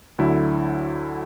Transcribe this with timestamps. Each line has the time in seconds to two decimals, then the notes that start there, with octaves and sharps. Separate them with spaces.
0.18 D2 D3 F#3 E4